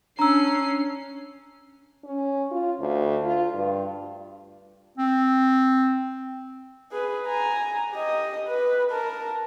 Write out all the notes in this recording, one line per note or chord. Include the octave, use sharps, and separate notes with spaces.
C#4 D4 A#5 E6 C7
C#4
F4
D2
F4
G2
C4
G#4 B4
G#5 A#5
G4 D#5
B4
A#4 A5